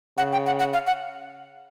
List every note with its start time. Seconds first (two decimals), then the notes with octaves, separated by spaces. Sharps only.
0.18 C#3 F#5
0.32 G5
0.46 F#5
0.59 F#5
0.73 F5
0.87 F#5